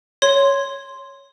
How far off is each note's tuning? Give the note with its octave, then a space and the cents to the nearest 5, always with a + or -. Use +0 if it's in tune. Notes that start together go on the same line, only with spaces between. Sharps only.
C#5 +0 C6 +0